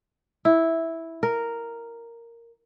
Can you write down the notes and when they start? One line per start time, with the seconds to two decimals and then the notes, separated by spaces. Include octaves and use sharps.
0.45 E4
1.23 A#4